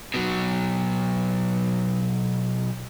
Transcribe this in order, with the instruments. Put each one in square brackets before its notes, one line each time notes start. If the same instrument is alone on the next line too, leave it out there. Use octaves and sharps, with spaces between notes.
[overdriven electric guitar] B2 F#3